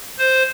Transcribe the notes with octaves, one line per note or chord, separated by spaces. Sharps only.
C5